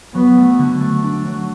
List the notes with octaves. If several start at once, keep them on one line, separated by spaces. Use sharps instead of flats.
F#3 B3
A3
D3
A3
D4
F#3